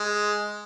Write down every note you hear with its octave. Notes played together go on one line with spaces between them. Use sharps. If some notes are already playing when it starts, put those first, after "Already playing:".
Already playing: G#3